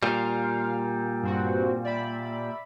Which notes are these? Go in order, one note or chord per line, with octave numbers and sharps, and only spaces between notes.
A#2 G3 F5
G2 C4 F#4
D5 E5 B5